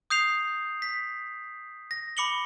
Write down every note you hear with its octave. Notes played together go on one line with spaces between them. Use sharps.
D#6 G6 C7 F7
B6
A#6
B5 D6 C#7 F#7 G7